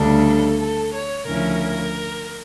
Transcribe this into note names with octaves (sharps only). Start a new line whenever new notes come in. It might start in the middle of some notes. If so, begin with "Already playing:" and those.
Already playing: D2 C#3 G3 D4 A4
A4
C#5
D2 C#3 F3 C#4 E4 A#4